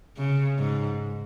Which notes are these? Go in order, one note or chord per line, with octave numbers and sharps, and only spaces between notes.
C#3
G#2